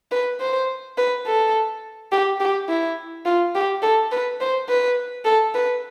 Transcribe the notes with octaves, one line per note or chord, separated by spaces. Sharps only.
B4
C5
B4
A4
G4
G4
E4
F4
G4
A4
B4
C5
B4
A4
B4